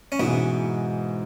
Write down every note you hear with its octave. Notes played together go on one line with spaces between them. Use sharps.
C#4
G#2 B2 E3 G#3 B3